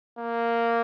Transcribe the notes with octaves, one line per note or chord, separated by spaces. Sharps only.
A#3